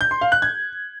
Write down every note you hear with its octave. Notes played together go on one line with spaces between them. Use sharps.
G6
C6
F5
F#6
G#6